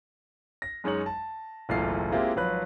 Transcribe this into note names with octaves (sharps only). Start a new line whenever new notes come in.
A#6
F#2 G#3 D#4 C#5 F#7
A5
F#1 B1 E3 A3 F4 C7
G#3 A#3 C4 E4 F4 G4
G#1 F3 F#3 B4 B5 F#6